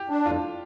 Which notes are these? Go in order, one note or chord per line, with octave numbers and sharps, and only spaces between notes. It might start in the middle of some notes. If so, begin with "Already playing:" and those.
Already playing: G4
D4
F2 F4